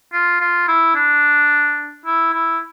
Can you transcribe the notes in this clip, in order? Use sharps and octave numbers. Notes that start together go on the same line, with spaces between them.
F4
F4
E4
D4
E4
E4